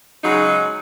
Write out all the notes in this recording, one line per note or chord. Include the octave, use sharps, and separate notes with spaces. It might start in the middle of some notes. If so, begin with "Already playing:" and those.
C#3 F#3 G#3 D#4